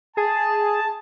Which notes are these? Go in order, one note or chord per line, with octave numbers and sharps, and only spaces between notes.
G#4 A5